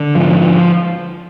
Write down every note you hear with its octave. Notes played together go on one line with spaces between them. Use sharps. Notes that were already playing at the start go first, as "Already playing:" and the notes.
Already playing: D3
G#2 F3